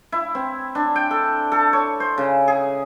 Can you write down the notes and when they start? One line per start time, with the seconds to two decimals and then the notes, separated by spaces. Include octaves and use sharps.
0.12 E4
0.35 C4
0.75 D4
0.96 G5
1.11 A4
1.52 A4
1.73 C#5
2.00 C5
2.18 C#3
2.48 G#4